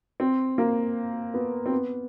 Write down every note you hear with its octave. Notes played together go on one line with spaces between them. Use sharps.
C4
A#3
B3
C4
B3